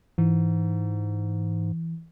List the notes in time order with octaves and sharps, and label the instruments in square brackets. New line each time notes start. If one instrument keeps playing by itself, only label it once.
[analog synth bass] G#2 [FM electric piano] E3